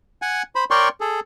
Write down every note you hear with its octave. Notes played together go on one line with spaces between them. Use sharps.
F#5 G#5
C5 B5
A#4 C#5 D5 G5 C6 C#6
G#4 A4